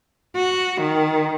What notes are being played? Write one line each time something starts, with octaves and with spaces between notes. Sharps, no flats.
F#4
D#3